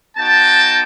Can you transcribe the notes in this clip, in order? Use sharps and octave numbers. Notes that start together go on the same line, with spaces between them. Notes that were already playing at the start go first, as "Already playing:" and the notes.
B3 D#4 F#4 G5 A5